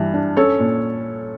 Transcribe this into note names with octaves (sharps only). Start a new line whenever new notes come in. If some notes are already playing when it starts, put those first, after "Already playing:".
Already playing: G2 E3
D4
C#4 A4 C#5
A#2